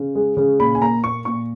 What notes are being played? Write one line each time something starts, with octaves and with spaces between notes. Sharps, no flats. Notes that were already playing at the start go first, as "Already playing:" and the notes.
Already playing: C#3
G#3
C#3
A#2 B5
G#5
A#3 A#5
A#2 C#6
A#2 C#6